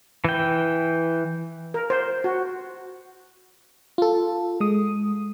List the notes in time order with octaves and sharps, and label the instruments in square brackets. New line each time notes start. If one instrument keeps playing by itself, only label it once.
[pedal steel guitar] E3 G5
[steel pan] A#4
C5
F#4
[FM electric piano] F4 A4
G#3 D#6